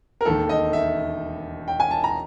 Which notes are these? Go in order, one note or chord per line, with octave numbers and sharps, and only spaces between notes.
A#4
E1 D#2 D#3 A4
D#5
E5
G5
G#5
A5
A#5